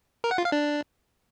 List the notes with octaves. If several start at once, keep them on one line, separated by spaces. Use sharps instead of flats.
A#4
F#5
F4
F5
D4